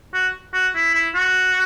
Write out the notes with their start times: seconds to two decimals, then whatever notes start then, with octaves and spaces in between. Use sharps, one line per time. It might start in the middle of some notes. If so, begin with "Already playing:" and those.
0.14 F#4
0.54 F#4
0.75 E4
0.95 E4
1.15 F#4